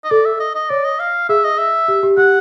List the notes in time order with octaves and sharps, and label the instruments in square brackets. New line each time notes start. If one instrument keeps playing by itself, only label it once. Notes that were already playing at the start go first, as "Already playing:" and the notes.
[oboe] D#5
[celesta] A4 [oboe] D5
[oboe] E5
D#5
D#5
[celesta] C#5 [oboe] D5
[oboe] D#5
F5
[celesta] G#4 [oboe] E5
[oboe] D#5
E5
[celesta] G4
G4
[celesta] G4 [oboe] F#5